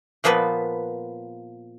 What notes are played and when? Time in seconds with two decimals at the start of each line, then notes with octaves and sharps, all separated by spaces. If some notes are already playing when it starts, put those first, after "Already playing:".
0.24 A#2 F3 A#3 B3 B4